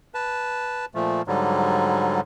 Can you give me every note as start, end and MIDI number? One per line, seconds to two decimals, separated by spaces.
0.14 0.85 71
0.14 0.85 81
0.95 1.22 46
0.95 1.22 53
0.95 1.22 57
1.27 2.21 44
1.27 2.21 50
1.27 2.21 54
1.27 2.21 55